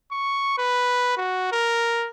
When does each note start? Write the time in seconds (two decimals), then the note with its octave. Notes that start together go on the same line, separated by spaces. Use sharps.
0.12 C#6
0.58 B4
1.17 F#4
1.52 A#4